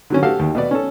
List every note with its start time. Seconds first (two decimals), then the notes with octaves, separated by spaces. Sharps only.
0.10 D3 F#3 C#4
0.23 F#4 G4 A4 F5
0.39 D#2
0.55 B2 B3 D5
0.71 C#4 A4